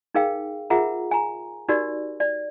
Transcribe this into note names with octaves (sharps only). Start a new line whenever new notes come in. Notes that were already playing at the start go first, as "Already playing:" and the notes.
D#4 G#4 A#4 F5 G5
F4 G#4 A#4 E5 F#5 A#5
G#5 A#5
D#4 F#4 G4 A#4 D5
D5